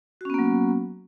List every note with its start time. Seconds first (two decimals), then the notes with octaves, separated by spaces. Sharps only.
0.21 F#4
0.25 C#4
0.30 B3
0.34 A#3
0.39 F#3